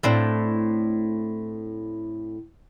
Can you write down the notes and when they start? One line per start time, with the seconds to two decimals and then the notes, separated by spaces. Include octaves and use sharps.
0.03 A2 C4 D4